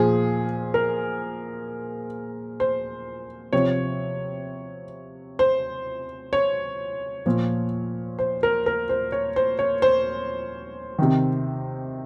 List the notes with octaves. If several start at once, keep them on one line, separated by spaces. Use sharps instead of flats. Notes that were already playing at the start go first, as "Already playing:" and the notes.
Already playing: A#2 F3 G#4
A#4
C5
C3 F3 C#5
C5
C#5
A#2 F3
C5
A#4
A#4
C5
C#5
C5
C#5
C5
C3 D#3